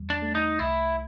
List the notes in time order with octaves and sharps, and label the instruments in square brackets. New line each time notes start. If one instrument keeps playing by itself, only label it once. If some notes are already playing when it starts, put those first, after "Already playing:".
Already playing: [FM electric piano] E2 G3
[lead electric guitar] D4
[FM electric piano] A3
[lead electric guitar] D#4
[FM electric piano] C2 [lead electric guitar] E4